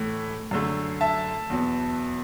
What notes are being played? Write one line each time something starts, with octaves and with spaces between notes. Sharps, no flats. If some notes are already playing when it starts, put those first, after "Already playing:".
Already playing: A2 E3 A3
F#2 D3 A3
E5 A5
E2 B2 F#3 B3